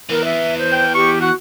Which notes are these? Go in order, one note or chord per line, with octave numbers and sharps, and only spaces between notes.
E3 B3 A#4
E5
C5
G5
G4 C#6
F#4 F#5